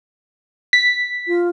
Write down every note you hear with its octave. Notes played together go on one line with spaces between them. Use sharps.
B6
F4